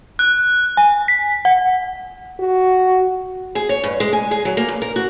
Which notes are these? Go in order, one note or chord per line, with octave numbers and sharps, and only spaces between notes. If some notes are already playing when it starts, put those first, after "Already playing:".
F#6
G#5
B6
F#5
F#4
G#4
C#5
G2
G#3
G#5
G#4
F#3
A#3
G2
A#4
F#4